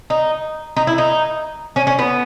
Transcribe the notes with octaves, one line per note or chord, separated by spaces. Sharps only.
D#4
D#4
E4
D#4
C#4
C#4
B3